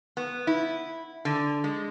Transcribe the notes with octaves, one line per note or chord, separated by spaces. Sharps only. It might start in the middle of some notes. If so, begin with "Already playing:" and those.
B3
E4
D3
G#3